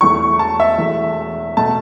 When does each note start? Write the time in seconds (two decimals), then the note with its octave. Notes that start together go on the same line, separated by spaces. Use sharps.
0.01 E1 E2 E3 A3 C#6
0.39 A5
0.60 E5
0.78 E1 E2 E3 A3
1.57 B2 A3 A5